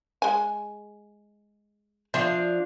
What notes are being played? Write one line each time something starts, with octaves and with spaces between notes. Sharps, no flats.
G#3 G#5
F3 D4 E5 F5